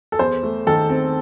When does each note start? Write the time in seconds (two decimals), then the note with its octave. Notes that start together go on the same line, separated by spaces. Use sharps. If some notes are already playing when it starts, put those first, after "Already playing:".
0.12 A4
0.19 E2 C5
0.43 A3
0.67 D#3 A4
0.89 C4